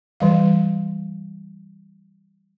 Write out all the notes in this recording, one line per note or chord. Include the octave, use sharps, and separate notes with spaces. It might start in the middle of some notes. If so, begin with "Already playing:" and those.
E3 G3 F5